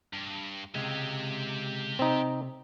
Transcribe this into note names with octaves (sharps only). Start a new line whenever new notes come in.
G2
C#2 C3 G#3 G4 E5
C3 C4 D#4